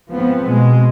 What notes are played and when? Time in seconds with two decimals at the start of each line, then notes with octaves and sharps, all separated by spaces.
0.12 G#2 F3 B3 C4
0.48 B2 G#3